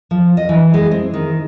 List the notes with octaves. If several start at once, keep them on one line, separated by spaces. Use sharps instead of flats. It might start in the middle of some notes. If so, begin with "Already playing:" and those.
F3
D#5
E3
G#3
C4
D#3